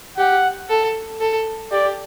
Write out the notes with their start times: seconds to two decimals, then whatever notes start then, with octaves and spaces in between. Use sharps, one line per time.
0.18 G4 F#5
0.70 A4
1.20 A4
1.72 G4 D5